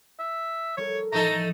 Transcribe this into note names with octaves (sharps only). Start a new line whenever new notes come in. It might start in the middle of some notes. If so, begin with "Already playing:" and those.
E5
G3 A4 A#4 C#5
A1 F3 A3 D#4 A4 A#5 D7